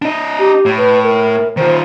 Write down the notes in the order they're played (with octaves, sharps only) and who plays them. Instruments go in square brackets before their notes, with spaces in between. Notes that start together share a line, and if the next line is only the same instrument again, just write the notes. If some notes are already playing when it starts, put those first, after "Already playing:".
[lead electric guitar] D4 D#5
[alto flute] G4
[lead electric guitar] A2
[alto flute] B4
A#4
[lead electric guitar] D#3 F4 [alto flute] C5